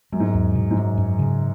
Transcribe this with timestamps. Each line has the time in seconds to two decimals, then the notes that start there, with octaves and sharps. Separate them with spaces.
0.12 F#2 G#3
0.20 G#2
0.28 F#2
0.34 E2
0.55 B2
0.71 G#2
0.77 F#2 F#3
0.97 F#2
1.19 C#3